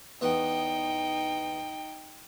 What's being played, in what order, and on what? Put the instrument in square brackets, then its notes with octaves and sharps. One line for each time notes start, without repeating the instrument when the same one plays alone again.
[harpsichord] E2 B3 [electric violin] D#4 G5